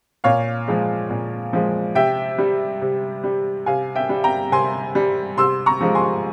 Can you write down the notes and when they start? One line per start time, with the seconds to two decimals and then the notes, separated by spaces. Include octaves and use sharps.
0.24 A#2 C#5 F5
0.68 F3 G#3
1.10 A#2
1.53 F3 G#3
1.95 C3 E5 G5
2.38 G3
2.81 C3
3.24 G3
3.66 C3 F5 G#5
3.95 E5 G5
4.09 G3
4.24 G5 A#5
4.52 C3 G#5 C6
4.95 G3
5.37 C3 C6 E6
5.66 A#5 C#6
5.81 F3 G#3
5.95 G#5 C6